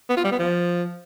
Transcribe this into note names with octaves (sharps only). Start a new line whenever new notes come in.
B3
F4
G3
B3
F3